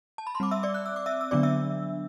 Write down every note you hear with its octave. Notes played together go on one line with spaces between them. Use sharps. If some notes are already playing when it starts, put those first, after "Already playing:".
A5
B5
C6
G3 C4 D6
E5 E6
D5 D6
F#6
E6
D6
E5 E6
E6
D3 F#3 B3 D4 D5 D6
E5 E6